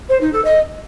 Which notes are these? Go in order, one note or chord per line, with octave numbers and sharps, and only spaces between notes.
C5
D#4
A4
D#5